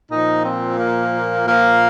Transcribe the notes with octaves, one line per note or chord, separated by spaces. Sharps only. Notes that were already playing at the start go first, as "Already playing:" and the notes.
A#2 F3 D#4
C4
A#3
A#2 F3 A#3